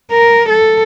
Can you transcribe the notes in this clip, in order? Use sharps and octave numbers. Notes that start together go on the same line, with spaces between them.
A#4
A4